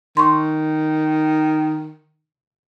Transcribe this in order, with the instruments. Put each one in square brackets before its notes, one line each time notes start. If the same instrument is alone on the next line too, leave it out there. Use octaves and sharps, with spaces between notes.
[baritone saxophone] D#3 [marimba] C6 C#6